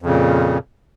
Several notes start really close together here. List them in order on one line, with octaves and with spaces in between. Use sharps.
F2 C#3 A#2